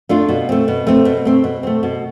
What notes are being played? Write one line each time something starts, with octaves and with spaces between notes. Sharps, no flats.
A3 D4 F4
B2
A3 C4
B2
A3 C4
B2
A3 C4
B2
A3 C4
B2